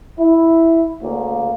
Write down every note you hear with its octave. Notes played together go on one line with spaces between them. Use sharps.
E4
D2 C#3 A#3